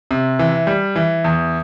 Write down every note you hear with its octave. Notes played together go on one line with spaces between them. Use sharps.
C3
E3
G3
E3
E2